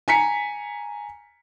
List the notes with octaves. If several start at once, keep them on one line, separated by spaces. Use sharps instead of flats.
G#5 A#5 B6 C#7